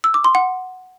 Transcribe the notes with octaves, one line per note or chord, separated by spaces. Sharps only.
E6
D6
C6
F#5